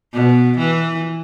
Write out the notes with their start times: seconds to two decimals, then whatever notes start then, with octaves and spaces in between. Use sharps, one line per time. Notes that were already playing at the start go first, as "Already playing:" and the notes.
0.14 B2
0.58 E3